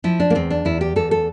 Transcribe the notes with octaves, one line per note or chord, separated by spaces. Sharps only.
F3 E4
D4
A#3
E2 C4
D4
E2 E4
G4
E2 A4
A4